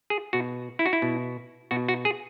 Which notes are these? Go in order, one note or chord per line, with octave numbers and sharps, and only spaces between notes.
G#4
B2 F#4
E4
F#4
E4
B2
B2 F#4
F#4
G#4